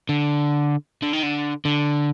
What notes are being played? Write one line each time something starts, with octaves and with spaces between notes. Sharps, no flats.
D3
D3
D#3
D3
D3